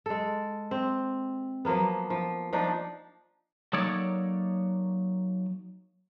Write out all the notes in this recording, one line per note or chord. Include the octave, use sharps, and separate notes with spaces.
G#3 A4
C4
F3 F#3 A#3 B3
F3
F3 D4 D#4
F#3 A#3 D#4 A4 C#5 D5